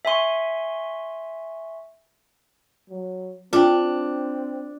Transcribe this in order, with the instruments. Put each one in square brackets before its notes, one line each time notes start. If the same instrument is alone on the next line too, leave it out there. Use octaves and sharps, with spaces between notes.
[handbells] E5 G#5 C6 C#6
[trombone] F#3
[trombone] C4 [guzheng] D4 [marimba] F4 G5